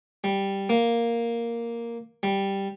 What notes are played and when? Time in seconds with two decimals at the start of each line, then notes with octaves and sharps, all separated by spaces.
0.24 G3
0.69 A#3
2.23 G3